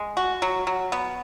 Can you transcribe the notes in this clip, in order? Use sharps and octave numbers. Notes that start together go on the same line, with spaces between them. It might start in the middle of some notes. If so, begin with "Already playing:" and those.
Already playing: G#3
F#4
F#3
F#3
B3